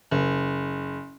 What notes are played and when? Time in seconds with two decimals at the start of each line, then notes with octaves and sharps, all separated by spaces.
0.11 F#1